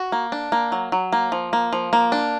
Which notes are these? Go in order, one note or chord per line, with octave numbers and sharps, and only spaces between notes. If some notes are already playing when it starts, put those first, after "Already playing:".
Already playing: F#4
A#3
D4
A#3
F#3
F#3
A#3
F3
A#3
F3
A#3
D4